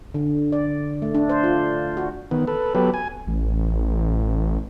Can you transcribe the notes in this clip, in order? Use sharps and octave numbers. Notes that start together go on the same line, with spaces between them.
D3
D5
A3
D4
C5
F4
F#4
D#3 B3
A4 B4
F#3 B3 G4 A4 B4
G#5
A1